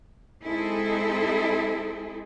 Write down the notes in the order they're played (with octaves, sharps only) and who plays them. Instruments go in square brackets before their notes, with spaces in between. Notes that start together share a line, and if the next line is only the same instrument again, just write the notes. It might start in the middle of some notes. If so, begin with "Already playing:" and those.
[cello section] G#3 C4 D#4 E4 G#4 A4